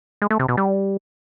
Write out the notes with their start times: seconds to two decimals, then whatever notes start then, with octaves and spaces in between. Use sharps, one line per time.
0.22 G#3
0.31 A3
0.40 C3
0.48 B2
0.57 G3